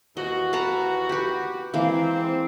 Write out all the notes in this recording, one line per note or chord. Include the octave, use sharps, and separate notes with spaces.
D#2 E3 F#4 D#5
B4 A5 A#5
G4 B4
E3 G#3 A#3 C4